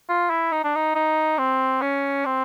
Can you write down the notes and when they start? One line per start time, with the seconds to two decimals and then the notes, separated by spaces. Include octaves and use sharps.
0.09 F4
0.30 E4
0.52 D#4
0.64 D4
0.75 D#4
0.95 D#4
1.38 C4
1.82 C#4
2.26 C4